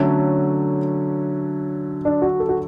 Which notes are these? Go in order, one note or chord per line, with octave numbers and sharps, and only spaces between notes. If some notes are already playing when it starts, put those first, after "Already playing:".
Already playing: D3 F#3 A3 C#4
D4
F#4
A4
F#4